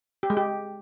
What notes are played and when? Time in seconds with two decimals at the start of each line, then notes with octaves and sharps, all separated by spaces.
0.23 G4
0.30 G#3
0.37 G4